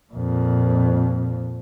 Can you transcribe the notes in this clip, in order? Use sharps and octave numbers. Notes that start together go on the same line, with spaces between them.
F2 A#2